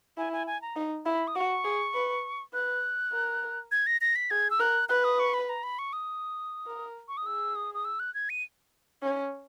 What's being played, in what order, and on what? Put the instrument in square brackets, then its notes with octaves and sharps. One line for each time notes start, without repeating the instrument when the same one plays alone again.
[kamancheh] E4 [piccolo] G#5
[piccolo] G#5
G#5
A#5
[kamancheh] D#4
[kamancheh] E4 [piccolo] B5
[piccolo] D#6
[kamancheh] F#4 [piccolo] C#6
[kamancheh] G#4
B4
[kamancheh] B4 [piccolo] F#6
[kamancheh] A#4
[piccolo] G#6
A#6
A#6
B6
[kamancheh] G#4 [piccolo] G#6
[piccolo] E6
[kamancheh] A#4 [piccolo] F#6
[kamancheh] B4 [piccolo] F#6
[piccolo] D#6
C#6
B5
A#5
B5
C#6
D#6
[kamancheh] A#4
[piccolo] C#6
D#6
[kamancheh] G#4 [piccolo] E6
[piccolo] D#6
D#6
E6
F#6
G#6
D#7
[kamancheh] C#4